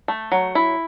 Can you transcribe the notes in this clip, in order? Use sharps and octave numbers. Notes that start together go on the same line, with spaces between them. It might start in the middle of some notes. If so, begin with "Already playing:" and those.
A3
F#3
E4